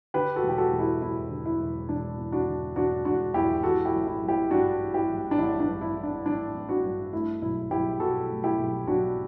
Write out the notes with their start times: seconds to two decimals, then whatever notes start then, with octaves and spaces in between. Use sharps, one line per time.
0.14 D3 G4 B4
0.36 F#4 A4
0.43 E1
0.49 G4
0.58 F#4 A4
0.72 E1
0.80 E4 G4
1.02 E2 E4
1.31 D3
1.46 E4
1.60 E1
1.89 E1 D4
2.18 E2
2.32 D4 F#4
2.47 D3
2.76 E1 D4 F#4
3.05 E1 D4 F#4
3.34 E2 E4 G4
3.63 E3 F#4 A4
3.85 E4 G4
3.93 A1
4.07 E4
4.22 A1
4.28 E4 G4
4.51 G2 D4 F#4
4.80 E3
4.94 E4 G4
5.09 A1
5.31 D4
5.38 A1 E4
5.60 D4
5.67 G2
5.81 E4
5.96 E3
6.03 D4
6.26 A1 D4
6.54 A1
6.69 D4 F#4
6.84 G2
7.13 A3 E4
7.42 B1 E4
7.71 B1 E4 G4
8.00 B2 F#4 A4
8.30 A3
8.44 E4 G4
8.58 B1
8.87 B1 D4 F#4